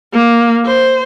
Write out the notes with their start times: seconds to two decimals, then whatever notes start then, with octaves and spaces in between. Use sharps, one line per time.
0.13 A#3
0.65 C5